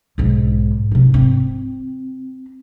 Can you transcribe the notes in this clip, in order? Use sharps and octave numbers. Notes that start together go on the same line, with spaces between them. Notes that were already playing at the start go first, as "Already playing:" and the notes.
B1 G#2
G#2 C3
C4